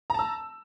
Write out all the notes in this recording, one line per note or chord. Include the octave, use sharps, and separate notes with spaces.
A5 A#5 E6